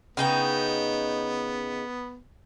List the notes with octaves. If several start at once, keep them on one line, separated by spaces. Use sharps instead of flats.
C#3 B3 D#4 G5